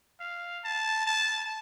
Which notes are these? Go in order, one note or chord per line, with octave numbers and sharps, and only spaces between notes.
F5
A5
A5